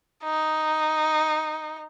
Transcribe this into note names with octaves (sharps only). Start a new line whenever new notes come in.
D#4